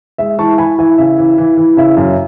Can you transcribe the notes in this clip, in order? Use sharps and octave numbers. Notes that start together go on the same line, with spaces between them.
G#3 E5
E3 A5 C#6
E3 G#5 B5
E3 E5 G#5
C#3 E5
E3
E3
E3
C#3 E5
F#2